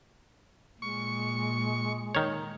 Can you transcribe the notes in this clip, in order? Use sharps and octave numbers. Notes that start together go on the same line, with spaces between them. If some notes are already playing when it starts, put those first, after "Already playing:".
A#2 G#3 C#6
D#3 C#5